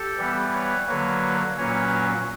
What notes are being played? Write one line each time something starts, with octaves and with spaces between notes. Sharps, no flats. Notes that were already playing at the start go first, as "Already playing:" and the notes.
Already playing: G4 A4
E3 G3 B3
B4 C#5
D3 F#3 A#3 B4 C#5
A#2 F#3 A#3 C#4 B4 C#5